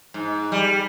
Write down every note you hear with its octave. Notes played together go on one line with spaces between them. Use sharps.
G#2
G3